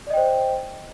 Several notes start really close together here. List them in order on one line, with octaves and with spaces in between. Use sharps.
D5 D#5 G5 C5